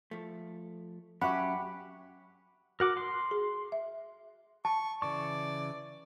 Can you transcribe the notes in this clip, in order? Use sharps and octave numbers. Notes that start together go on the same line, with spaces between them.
F3 A3
F#3 C#4 G4 E5 F#5 B5 C#6
F#4 A#4 F#5 D6
C6
G#4
E5
A5 C#6
C#3 E3 D5 C#6